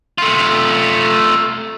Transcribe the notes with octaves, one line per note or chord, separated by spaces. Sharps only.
A3 F4